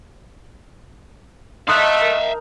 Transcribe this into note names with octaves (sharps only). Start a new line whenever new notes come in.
A3 D#4 A4 E5 F5 C6 D#6 F#6
A#4